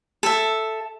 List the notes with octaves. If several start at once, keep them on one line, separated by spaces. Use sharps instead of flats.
A4 E5